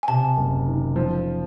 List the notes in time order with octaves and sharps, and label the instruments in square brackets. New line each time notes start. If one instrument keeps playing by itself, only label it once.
[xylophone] G#5
[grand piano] C3 [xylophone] A5
[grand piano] F#1
D#3
F3